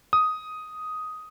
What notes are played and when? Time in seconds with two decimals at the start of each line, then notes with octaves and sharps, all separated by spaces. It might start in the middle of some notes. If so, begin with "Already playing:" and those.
0.13 D#6